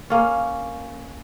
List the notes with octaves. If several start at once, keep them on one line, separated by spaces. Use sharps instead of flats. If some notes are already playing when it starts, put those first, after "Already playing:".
A#3 C#4